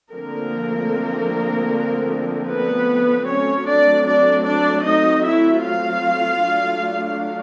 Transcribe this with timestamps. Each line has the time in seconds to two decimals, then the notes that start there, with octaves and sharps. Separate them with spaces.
0.12 D3 F3 A3 A#3 C4 A#4
2.48 B3 B4
3.27 F#3 A3 C4 C#4 C#5
3.67 D4 D5
4.06 D4 D5
4.46 D4 D5
4.85 D#4 D#5
5.25 E4 E5
5.65 F4 F5
6.43 F#3 A3 D4